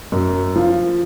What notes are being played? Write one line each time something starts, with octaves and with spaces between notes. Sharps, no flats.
F#2
F3